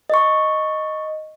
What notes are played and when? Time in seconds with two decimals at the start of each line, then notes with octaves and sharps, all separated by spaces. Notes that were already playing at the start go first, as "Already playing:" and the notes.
0.10 D#5 C#6